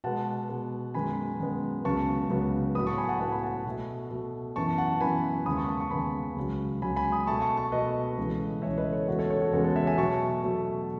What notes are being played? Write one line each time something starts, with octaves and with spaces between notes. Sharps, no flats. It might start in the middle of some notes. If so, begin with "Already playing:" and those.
B2 G#3 B3 F#5 A5
B2 G#3 B3
F#2 D#3 G#3 B3 G#5 B5
F#2 D#3 G#3 B3
C#2 C#3 F#3 B3 A5 C#6
C#2 C#3 F#3 B3
A2 F#3 B3 B5 D#6
A5 C#6
G#5 B5
F#5 A5
A2 F#3 B3 F#5 A5
G#5 B5
F#5 A5
B2 A3
B2 A3
F#2 E3 B3 A5 C#6
F#5 A5
F#2 E3 B3 G#5 B5
D#2 C#3 G#3 B3 B5 D#6
A5 C#6
A5 C#6
A5 C#6
D#2 C#3 G#3 B3 G#5 B5
C#2 C#3 F#3
C#2 C#3 F#3 G#5 B5
G#5 B5
B5 D#6
B2 A3 A5 C#6
A5 C#6
A5 C#6
B2 A3 B4 D#5
C#2 C#3 E3 A3
C#2 C#3 E3 A3 C#5 E5
B4 D#5
A4 C#5
E2 C#3 G#3 B3 F#4 A4
A4 C#5
A4 C#5
F#4 A4
E2 C#3 G#3 B3 F#4 A4
A4 C#5
C#5 E5
E5 G#5
B2 F#3 A3 A5 C#6
B2 F#3 A3